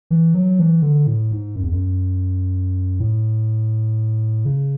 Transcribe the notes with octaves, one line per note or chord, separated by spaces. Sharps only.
E3
F#3
E3
D3
A2
G#2
F#2
E2
F#2
A2
C#3